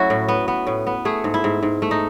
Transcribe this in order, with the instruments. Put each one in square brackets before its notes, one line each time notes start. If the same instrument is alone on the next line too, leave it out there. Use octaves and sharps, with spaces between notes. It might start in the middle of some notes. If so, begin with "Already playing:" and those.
Already playing: [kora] F#3 A3 C#4 E4 F#4
A2
B3
B3
A2
B3
A3 G#4
G#2
E4
G#2
G#2
A3
D#4